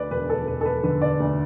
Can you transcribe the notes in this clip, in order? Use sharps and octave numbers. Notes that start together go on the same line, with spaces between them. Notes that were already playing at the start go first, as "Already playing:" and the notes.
Already playing: D2 B4 D5
E1 B4
A4
E1 B4
A4
B4
D3 B4
D5
D2